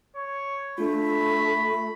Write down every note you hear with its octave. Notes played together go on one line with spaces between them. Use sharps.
C#5
A3 D4 F4 B5